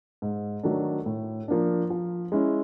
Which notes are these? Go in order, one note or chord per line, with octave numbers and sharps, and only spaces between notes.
G#2
D#3 F#3 A3 D4
A2
F3 A#3 D4
F3
G#3 C#4 E4